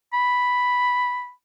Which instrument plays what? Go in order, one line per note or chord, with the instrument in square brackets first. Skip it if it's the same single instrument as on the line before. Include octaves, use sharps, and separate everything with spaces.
[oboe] B5